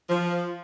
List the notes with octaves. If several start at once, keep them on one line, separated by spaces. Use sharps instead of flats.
F3